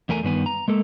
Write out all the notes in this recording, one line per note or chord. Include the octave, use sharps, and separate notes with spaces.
E2 A3 A#4 G#5
G2 D#3 B3 G#5
A#5
G#3 A#3 A4